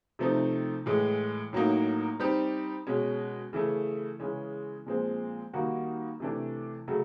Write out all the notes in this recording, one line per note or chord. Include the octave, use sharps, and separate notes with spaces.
C3 F3 A3 C4 D#4
A2 E3 G#3
A2 F#3 A#3 D#4
G3 C4 D#4 G4
B2 G#3 C#4
C#3 E3 A3
C#3 E3 G#3 C#4
A#2 F3 G#3 C4
D#3 G3 A#3 D#4 F#4
C3 E3 A3 D4
C#3 F#3 A3